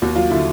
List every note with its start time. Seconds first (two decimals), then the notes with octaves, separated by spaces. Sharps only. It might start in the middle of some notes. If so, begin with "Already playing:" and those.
0.02 D#2 F#4
0.16 F#3 F4
0.30 D3 E4